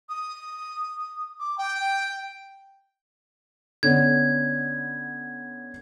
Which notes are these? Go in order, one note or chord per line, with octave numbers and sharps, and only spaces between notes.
D#6
D6
G5
D3 B3 C#4 G#6